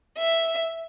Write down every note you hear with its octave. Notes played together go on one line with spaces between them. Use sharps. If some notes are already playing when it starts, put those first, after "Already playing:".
E5